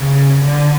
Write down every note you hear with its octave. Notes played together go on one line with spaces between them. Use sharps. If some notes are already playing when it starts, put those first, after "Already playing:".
Already playing: C#3
D3